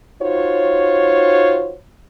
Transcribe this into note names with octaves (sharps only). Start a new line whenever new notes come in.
D#4 F4 F#4 C5 C#5